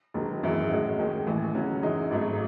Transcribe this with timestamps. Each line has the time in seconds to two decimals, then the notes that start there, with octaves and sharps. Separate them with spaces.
0.14 E1 D#2 D#3 F#3
0.43 G#1 F#2 E3 G#3
0.71 A2 G#3 C#4 F#4
0.99 D#2 D#3 G#3
1.27 A1 A2 E3
1.54 C#2 C#3 F#3 C#4 F#4
1.83 F#2 E3 G#3 D#4
2.11 G#1 G#2 F#3 A3